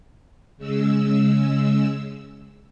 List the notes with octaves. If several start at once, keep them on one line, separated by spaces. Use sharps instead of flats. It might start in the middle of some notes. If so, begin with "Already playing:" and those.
C#3 G#3 E6